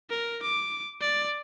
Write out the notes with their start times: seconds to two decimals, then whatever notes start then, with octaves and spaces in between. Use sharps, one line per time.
0.10 A#4
0.43 D6
1.01 D5